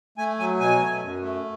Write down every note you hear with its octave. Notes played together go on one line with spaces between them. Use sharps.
A3 G#5
F#3 G#5
B2 G#5
A3
F#2
A3